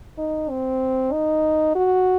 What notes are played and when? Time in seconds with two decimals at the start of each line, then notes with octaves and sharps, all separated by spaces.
0.18 D#4
0.50 C4
1.12 D#4
1.76 F#4